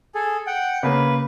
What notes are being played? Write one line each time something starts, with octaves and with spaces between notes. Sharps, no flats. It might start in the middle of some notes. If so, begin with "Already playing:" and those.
G#4 A4
F#5 G5
C#3 A#3 B4